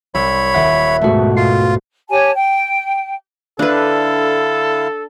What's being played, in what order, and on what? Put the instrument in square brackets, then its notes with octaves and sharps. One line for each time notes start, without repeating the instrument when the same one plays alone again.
[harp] C2 E6 [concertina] C#5 B5
[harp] D#1 F#5 B6 [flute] E5
[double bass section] G#2 B2 [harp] A3 F#4
[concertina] F4 [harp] C7
[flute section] G4 C#5 G#5 A5
G5
[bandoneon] D3 E4 F5 [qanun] D4 B4 [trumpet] A4